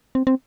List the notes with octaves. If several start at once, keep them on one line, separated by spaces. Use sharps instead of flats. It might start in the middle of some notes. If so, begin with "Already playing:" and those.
C4
C4